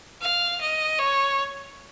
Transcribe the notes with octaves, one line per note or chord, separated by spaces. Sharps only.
F5
D#5
C#5